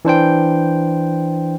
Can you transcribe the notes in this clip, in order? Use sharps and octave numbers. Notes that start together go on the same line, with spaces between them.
E3 D4 C5 G5